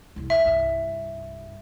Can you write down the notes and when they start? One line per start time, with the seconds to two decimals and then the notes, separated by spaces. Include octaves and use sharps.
0.16 C2 F2
0.30 E2 E5
0.45 C2 G2